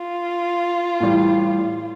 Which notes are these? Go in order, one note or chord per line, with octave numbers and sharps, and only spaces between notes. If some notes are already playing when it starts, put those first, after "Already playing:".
Already playing: F4
A2 E3 G3